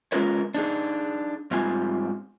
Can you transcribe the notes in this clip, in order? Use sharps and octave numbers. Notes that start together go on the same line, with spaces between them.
G#3 C#4 F4 A#4 B4 C#5
D4 D#4 G#4
G#2 G3 C4 F4 G#5